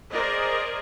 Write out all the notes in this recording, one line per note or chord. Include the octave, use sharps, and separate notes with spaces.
G#4 A#4 C5 D5 D#5